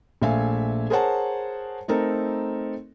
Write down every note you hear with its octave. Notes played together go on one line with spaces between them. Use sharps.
A#1 A3 E5 F5 G#5
G#4 A#4 C5 C#5 F#5 A5
A3 C4 D#4 A4 A#4